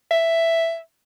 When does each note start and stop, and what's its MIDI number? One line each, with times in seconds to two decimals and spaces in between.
0.11 0.79 76